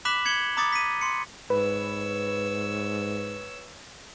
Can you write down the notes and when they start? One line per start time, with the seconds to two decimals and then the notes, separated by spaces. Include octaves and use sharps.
0.05 B5 D6 F#6 B6 E7 F#7
0.25 G#6 C#7 F#7 G7
0.57 A#5 B5 D6 D#6 A6 C#7
0.73 B6 D#7
1.01 C6 C#7
1.50 G#2 B4 C#5 E6